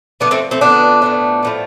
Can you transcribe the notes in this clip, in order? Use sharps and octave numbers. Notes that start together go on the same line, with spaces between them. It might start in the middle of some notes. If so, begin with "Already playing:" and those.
D3 F3 A3 B3 D4
A3 C4
A3 C4
D3 F3 A3 B3 D4
A2 F3 A3
A2 F3 A3